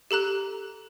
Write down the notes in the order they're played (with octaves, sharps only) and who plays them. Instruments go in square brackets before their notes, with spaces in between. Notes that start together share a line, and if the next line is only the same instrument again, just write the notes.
[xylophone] G4 A4 A#5 F#6